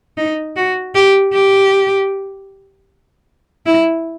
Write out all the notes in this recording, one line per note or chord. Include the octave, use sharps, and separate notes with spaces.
D#4
F#4
G4
G4
E4